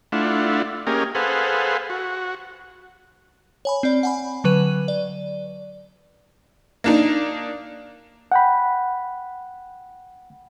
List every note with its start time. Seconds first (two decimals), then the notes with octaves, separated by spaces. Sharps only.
0.12 A3 D4 E4 F4 F#5
0.87 A#3 C#4 G4 G#4 A#4 D#5
1.15 G#4 A4 B4 C5 F5 F#5
1.90 F#4
3.65 C#5 G#5 B5
3.83 C4 D5
4.03 F#5 G#5 B5
4.44 D3 F#3 B4 D#7
4.88 D5
6.84 A#3 D4 D#4
8.32 F#5 G5 B5